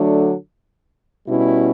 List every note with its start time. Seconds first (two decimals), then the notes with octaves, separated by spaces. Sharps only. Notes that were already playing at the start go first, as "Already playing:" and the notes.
Already playing: D3 F#3 A3 D4
1.26 B2 G3 C#4 E4